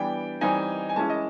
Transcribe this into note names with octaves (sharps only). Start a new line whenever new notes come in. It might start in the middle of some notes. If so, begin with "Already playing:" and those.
Already playing: E3 G3 B3 D4 G5
E3 G3 C4 D#4 G#5
G#5
E3 G#3 C#4 E4 A5
D#5